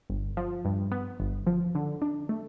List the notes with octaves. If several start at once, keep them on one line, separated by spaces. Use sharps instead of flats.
G1
F3
G2
B3
G1
F3
D3
D4
A3